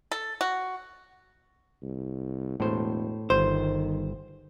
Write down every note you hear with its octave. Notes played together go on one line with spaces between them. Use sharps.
A4
F#4
C2
E1 A2 C5
G1 D#3 C5